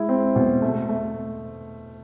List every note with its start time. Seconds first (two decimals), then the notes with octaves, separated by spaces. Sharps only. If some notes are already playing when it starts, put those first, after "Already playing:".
Already playing: G#3 E4
0.09 C4
0.36 B2
0.62 A3
0.89 A3